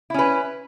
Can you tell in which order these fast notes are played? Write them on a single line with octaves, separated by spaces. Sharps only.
E4 C#4 B4